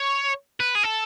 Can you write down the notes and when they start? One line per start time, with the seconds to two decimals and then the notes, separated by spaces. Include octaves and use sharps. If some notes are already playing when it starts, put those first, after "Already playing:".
Already playing: C#5
0.60 B4
0.75 G#4
0.83 A4